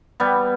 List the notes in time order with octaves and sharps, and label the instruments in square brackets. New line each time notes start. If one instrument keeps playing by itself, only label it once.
[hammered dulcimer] G3 B3